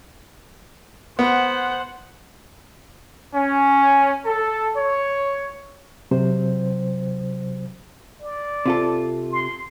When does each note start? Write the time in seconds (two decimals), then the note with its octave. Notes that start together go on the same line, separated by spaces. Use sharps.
1.19 B3 C5 F#5
3.34 C#4
4.25 A4
4.77 C#5
6.11 C3 F#3 C5
8.22 D5
8.66 C3 F4 A4
9.31 C6